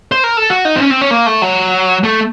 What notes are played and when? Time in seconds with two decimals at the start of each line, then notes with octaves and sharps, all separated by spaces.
0.12 C5
0.24 A#4
0.37 A4
0.50 F#4
0.65 D#4
0.76 C4
0.81 C#4
0.90 C4
1.01 C#4
1.11 A#3
1.26 A3
1.42 F#3
2.04 A3